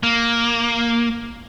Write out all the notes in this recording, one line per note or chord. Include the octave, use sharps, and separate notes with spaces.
A#3